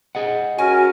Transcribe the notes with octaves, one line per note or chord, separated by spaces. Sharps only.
G#4 D#5 F#5
C#4 F#4 A#4 G#5